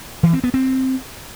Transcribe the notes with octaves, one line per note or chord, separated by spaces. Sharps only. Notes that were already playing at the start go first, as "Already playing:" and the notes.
E3
C4
B3
C4